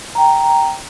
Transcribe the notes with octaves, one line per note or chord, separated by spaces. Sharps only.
G5 A#5